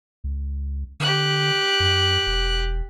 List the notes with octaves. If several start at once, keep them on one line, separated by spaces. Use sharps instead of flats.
C#2
D3 G4 F#6
F#2
E1